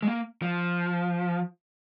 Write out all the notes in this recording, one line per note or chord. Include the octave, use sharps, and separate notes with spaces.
G#3
A#3
F3